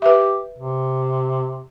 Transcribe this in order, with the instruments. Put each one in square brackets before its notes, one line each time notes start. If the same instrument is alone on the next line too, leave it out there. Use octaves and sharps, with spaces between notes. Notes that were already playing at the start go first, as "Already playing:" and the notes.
[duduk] G4 [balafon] B4 E5
[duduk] C3